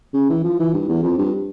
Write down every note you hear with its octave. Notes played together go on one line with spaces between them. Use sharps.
C#3
E3
F3
E3
G2
E2
F2
G2